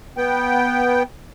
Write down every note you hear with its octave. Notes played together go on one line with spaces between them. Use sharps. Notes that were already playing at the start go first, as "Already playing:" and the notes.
B3 G5